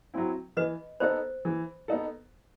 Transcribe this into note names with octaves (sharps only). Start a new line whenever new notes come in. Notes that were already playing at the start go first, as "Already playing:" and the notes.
F#3 C4 E4
E3 B4 D#5
B3 D#4 A4 C5
E3
B3 D#4 A4